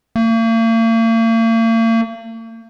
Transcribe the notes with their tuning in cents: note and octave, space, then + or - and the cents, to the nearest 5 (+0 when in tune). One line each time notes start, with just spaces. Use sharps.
A#3 -45